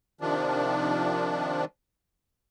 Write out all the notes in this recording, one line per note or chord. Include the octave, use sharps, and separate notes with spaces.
C3 D#3 F3 D4